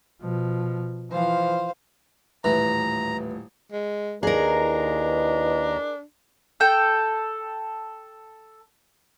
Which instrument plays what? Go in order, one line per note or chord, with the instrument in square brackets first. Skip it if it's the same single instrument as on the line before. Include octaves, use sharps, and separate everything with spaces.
[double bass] B2 F3
[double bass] E3 F3 [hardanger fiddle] C5 F5
[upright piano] D#1 A2 [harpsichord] E3 [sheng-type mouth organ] A#5
[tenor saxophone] G#3
[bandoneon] D#2 A#5 [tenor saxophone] D4 [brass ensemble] E4 B4 D#5 [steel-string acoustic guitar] G#4 A#4
[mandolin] A4 G5